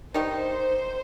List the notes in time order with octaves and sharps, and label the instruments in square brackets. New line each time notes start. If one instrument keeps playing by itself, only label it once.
[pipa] D#3 G3 D#4 [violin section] C5